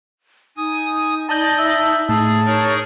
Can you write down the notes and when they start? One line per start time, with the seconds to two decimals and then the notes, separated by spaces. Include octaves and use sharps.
0.57 D#4 G#5 D#6
1.29 D5 D#5 A5 D#6 G6
1.58 E5
2.09 A2 G#4 A5
2.46 D#4 G#4 A#4 C#5